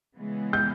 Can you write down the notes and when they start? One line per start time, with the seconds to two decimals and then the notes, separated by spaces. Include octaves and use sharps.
0.15 C#3 E3 G#3 B3
0.53 G6